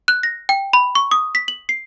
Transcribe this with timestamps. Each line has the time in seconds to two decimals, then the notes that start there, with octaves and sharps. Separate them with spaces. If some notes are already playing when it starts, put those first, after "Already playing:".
0.08 F#6
0.23 A#6
0.49 G5
0.73 B5
0.95 C#6
1.11 D#6
1.35 B6
1.48 F#7
1.69 C7